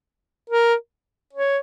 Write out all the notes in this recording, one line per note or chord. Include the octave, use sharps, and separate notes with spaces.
A#4
C#5